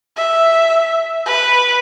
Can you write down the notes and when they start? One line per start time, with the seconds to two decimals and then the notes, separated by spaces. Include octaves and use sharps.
0.17 E5
1.26 B4